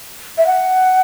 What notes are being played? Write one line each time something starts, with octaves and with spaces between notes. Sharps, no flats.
E5
F#5